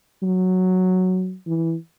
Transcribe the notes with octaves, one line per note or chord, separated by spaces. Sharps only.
F#3
E3